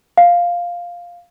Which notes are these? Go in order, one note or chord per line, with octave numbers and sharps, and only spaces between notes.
F5